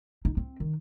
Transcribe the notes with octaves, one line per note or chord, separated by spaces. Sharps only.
D#4
C4
D#3